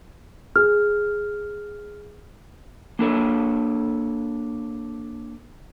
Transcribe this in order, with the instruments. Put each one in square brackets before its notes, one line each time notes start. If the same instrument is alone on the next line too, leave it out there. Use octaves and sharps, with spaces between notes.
[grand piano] G#4 [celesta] F6
[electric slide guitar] A#3 D4 A4 C#5